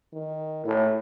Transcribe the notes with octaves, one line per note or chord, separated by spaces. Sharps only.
D#3
A2 E4